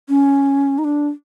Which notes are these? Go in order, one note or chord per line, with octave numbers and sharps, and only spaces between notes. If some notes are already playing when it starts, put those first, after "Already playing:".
C#4
D#4
D4